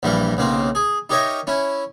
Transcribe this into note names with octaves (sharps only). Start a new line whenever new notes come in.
A#1 G2 E3 G3 A#4
B1 C#3 A#3 C4
G#4
D#4 G4 A#4 C#5 D#5 E5
C#4 E4